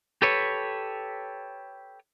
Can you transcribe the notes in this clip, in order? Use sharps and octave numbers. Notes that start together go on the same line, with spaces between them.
G4 A4 B4 C#5